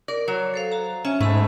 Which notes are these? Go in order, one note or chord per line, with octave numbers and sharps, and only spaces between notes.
A#4 D5
F#3 C#5
A4 C5 F5
F#4 A#5
C#4 E5
G#2 A3 B3 B5